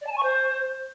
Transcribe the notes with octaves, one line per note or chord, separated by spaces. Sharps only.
D5
A5
G#5
C#6
C5